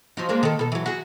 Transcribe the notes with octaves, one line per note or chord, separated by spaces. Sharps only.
F3 F#3 D#4
G#3 A#3 D4
D#3 A4
B2 A4
E3 F#3
F#4 G#4